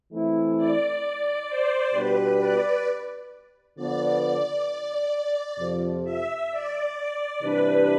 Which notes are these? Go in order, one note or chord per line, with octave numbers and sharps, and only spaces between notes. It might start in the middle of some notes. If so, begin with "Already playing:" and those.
E3 A3 C4 E4
D5
C5
B2 G3 B3 D4 G4 B4
D5
D3 F3 B3 D5
D5
D5
F2 C3 F3
E5
D5
C3 E3 G3 D4 B4